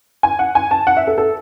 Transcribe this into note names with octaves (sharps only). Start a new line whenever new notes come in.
G#5
F#5
G#5
A5
F#5
E5
A4
A4